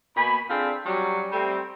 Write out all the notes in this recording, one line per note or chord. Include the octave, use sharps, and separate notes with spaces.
B2 A#3 G#5 B5
C4 D4 F4 G#4 A4 F5
F#3 G3 C#4
G3 A3 C4